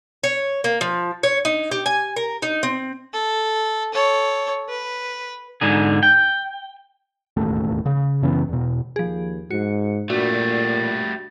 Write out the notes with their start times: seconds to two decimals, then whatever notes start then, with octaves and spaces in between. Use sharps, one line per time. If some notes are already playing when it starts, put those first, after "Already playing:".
0.24 C#5
0.64 A#3
0.81 F3
1.23 C#5
1.45 D#4
1.71 G4
1.86 G#5
2.16 A#4
2.42 D#4
2.63 C4
3.14 A4
3.94 A4 C#5
4.69 B4
5.61 G#2 D3 G#4
6.03 G5
7.37 E1 A1 D#2 A3
7.86 C#3
8.22 F#2 C#3 E3 B3
8.49 E2 B2
8.96 D#2 F3 G#4
9.50 G#2 F#4 C#7
10.10 A#2 G3 A3 D4 F#4 D5